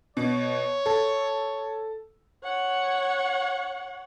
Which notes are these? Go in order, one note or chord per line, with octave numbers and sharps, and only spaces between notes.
B2 C#5
A4
C#5 F#5